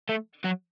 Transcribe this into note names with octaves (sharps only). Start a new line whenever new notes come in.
A3
F#3